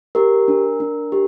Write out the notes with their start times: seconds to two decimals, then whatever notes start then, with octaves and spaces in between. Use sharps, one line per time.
0.15 G4 A#4
0.48 D4
0.80 D4
1.12 G4